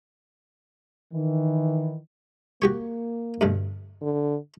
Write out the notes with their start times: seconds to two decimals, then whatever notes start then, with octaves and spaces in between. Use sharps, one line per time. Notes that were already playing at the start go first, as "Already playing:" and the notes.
1.12 D#3 E3
2.62 A#3 F#4 G4 C#5
3.41 D2 G2 B2
4.02 D3